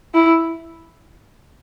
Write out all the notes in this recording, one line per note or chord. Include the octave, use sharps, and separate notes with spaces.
E4